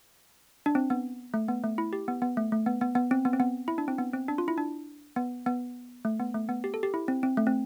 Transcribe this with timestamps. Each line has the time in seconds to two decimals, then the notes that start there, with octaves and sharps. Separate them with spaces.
0.66 D4
0.75 C4
0.90 B3
1.34 A3
1.48 B3
1.64 A3
1.78 E4
1.93 G4
2.08 B3
2.22 B3
2.37 A3
2.52 A3
2.66 B3
2.81 B3
2.95 B3
3.11 C4
3.25 B3
3.33 C4
3.40 B3
3.68 E4
3.78 D4
3.88 C4
3.98 B3
4.14 C4
4.28 D4
4.38 F4
4.48 E4
4.58 D4
5.16 B3
5.46 B3
6.05 A3
6.20 B3
6.34 A3
6.49 B3
6.64 G4
6.74 A4
6.83 G4
6.94 E4
7.08 C4
7.23 C4
7.37 A3
7.47 C4